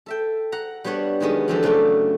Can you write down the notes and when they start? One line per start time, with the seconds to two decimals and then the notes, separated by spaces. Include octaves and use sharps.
0.06 A4 E5 G5
0.52 F#5 A#5
0.84 G3 B3 D4 C#5 F#5
1.20 D#3 F#3 G#3 B3 C#4
1.48 D3 E3 F3 C4 G4 A4
1.63 F#2 C#3 A3 D4 G4 G5